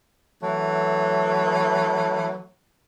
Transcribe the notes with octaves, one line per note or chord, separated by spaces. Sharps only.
E3 F#3 A3